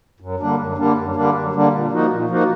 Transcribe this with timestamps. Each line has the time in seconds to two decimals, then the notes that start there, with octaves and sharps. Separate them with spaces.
0.20 F#2
0.40 D3 G3 A#3 D4
0.59 F#2
0.77 D3 G3 A#3 D4
0.97 F#2
1.15 D3 G3 A#3 D4
1.35 F#2
1.53 D3 G3 A#3 D4
1.72 A#2
1.91 F3 A#3 D#4 F#4
2.10 A#2
2.28 F3 A#3 D#4 F#4